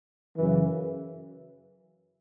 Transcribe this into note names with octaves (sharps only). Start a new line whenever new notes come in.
F#2 C#3 E3